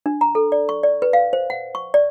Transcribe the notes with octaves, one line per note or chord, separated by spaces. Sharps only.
D4
A#5
A4
D5
C#6
D5
B4
F5
C5
F#5
C#6
D5